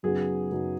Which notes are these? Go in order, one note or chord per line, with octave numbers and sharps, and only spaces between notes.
F#2 C#3 F#3 B3 D#4 G#4
F#2 C#3 F#3 B3 D#4